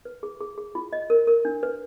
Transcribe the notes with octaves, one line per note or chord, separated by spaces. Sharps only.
B4
G#4
G#4
G#4
F4
D#5
A#4
A#4
D4
B4